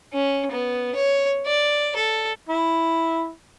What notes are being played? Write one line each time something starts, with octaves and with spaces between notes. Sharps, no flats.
C#4
B3
C#5
D5
A4
E4